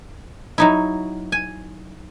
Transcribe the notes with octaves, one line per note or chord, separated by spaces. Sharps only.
F#3 D#4 E4
G#5